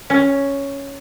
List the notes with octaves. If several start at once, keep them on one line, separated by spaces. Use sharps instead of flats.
C#4